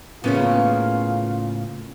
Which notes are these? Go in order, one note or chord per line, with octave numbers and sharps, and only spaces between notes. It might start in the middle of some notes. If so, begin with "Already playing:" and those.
A2 C#3 A#3 B3 C#4 F4 C#5 F5